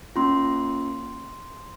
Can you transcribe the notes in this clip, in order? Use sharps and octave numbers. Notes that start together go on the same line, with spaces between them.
A#3 C#4 F4 C6